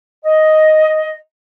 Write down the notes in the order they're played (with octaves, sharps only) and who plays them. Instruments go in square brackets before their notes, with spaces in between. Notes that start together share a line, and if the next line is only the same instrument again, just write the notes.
[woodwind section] D#5